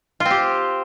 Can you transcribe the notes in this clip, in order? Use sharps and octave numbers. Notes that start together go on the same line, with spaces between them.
F4
C4
G4